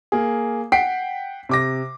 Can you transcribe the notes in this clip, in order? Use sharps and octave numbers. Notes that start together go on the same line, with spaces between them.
A#3 G#4
F#5 G5 B6 C7 D7
C3 D6 A#6